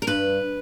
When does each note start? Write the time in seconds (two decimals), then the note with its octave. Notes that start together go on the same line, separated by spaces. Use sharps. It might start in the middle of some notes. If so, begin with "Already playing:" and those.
0.02 A#4
0.07 G2 B4